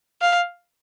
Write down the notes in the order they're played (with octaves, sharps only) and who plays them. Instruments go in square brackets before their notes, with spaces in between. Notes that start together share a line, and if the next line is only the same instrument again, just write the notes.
[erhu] F5